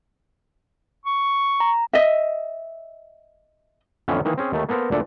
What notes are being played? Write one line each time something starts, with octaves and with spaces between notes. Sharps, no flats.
C#6
A#5
D#5 E5
F2 A2 D3 E3 B3 C#4
D#3 E3 A#3 D#4
C4 C#4 G#4
D#2 D#3 A3
A#3 B3 A4 A#4 C5
D2 A#2 D4 A4 D5